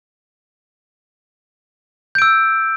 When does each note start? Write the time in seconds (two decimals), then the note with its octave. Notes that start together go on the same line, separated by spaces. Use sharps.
2.15 G6
2.18 D7
2.22 E6